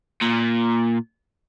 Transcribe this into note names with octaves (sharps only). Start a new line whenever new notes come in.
A#2